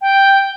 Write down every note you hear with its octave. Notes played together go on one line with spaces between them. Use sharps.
G5